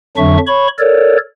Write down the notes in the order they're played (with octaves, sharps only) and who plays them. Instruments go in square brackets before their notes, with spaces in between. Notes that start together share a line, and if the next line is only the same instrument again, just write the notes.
[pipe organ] F2 D3 F#3 D4 E5 C#6
C#5 B5 C#6
A4 A#4 C#5 D5